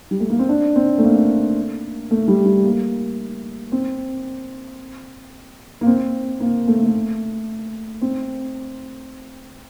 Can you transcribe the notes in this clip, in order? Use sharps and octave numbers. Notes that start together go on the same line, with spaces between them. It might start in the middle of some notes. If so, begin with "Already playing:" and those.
G3
A3
A#3
C4
D4
C4
A3
A#3
A3
G3
G3
A#3
C4
A#3
C4
A#3
A3
A#3
A3
C4